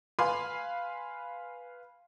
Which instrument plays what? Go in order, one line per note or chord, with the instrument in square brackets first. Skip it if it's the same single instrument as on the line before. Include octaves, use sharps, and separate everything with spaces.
[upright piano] B4 F5 G#5 B5 C6